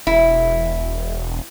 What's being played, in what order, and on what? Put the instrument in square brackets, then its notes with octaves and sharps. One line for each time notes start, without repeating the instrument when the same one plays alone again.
[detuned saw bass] E1 [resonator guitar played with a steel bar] E4